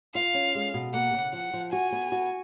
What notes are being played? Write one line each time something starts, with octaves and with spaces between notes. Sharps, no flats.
F4 F5
C#4
G#3
B2
A#3 F#5
C#3
F3 F#5
F3
F#4 G#5
B3
F#4